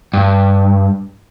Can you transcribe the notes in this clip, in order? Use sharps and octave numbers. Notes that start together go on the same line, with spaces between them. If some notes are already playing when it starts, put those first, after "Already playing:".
G2